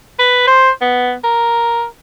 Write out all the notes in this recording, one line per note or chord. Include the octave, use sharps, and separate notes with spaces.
B4
C5
B3
A#4